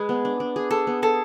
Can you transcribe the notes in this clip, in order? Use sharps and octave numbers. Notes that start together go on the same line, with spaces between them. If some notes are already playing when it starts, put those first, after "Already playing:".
Already playing: G#3 G#4 B4
B3
D4
D4
G#4
G#4 A4
B3
G#4 A4